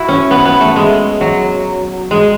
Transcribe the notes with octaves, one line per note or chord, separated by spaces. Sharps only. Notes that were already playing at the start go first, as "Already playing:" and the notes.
Already playing: E4 F#4
C#4
B3
B3
A3
G#3
F#3
G#3